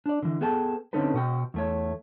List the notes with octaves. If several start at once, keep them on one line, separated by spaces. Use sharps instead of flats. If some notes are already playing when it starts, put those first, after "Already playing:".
D4 D5
D3 E3
B3 G#4 A4 G5 A5
D3 C4 C#4 D#4 A4 B4
B2 F#4 G5
E2 A3 C#5